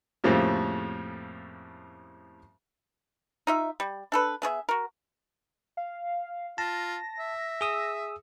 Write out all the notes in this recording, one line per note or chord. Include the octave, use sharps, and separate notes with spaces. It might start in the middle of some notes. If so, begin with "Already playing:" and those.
F2 A2 C#3 F3 G3 A#3
D#4 F4 E5
G3
D4 A4 B4
B3 G#4 C#5 E5
F#4 A#4
F5
F4 A5 A#6
E5
G#4 D#6 E6